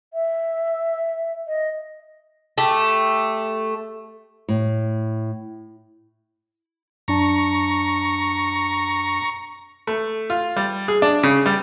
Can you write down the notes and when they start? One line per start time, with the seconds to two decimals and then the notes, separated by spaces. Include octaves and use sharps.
0.14 E5
1.47 D#5
2.58 A3 G4
4.48 A2
7.08 F#2 D4 A5 A#5 C#6
9.87 A3
10.30 F4
10.57 G3
10.88 G#4
11.02 D4
11.23 C#3
11.46 G3